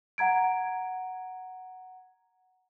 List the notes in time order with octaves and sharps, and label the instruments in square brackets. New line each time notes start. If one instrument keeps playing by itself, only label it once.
[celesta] F#5 A#5 G#6 D7